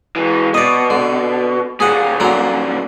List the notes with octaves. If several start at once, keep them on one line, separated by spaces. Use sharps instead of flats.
E3 G#3
B2 D5 D#5
D3
D#2 A#2 G#4 F#5
D3 F#3 A#5